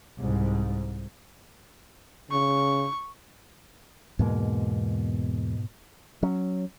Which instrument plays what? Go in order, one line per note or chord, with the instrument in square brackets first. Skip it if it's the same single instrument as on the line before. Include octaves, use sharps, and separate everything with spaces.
[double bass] C2 G#2
[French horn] C#3 [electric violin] C#6
[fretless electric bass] E2 G#3 A#3 [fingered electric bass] G#2 B2
[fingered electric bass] F#3 [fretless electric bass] C#4